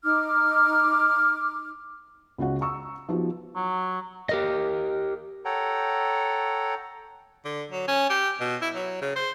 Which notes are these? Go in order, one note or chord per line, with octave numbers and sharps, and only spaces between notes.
D#4 D6 F6
C#2 C#4 F#4 F#5
A#5 C#6 E6
F3 B3 D#4 F#4 G4
F#3
G4 A#4 D#5
A4 C#5 F#5 G5 A#5
D3
F#3
C#4
G4
B2
E4
F#3
C#3
C5